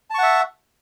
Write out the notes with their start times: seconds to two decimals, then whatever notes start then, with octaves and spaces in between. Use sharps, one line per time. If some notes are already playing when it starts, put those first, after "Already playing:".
0.10 A5
0.14 C#6
0.18 F#5
0.23 E5